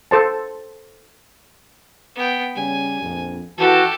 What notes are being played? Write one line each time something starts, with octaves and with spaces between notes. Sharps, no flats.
A4 C5 A5
B3 G5
C#3 G3 C#4 G#5
A#1 F2
E3 F#4 G4 A4 A5